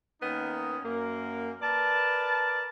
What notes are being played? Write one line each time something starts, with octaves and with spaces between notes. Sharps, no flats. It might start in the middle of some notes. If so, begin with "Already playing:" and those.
D#3 A#3 B3 C#4 D#4
F#2 A#3
A#4 B4 D5 A5